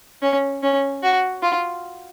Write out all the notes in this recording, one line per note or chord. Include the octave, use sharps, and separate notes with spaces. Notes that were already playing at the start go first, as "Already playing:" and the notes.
C#4
C#4
F#4
F4